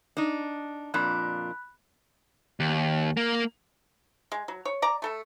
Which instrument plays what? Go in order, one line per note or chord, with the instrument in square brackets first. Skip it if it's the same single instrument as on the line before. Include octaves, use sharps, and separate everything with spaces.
[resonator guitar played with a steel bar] D4 D#4
[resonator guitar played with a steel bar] F2 A#2 D4 [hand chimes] B5 F#6
[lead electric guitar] D#2
A#3
[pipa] G#3
F#3
C#5
D5 A#5
A3 A4 E5